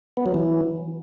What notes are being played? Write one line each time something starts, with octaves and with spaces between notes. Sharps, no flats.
B3
F#3
E3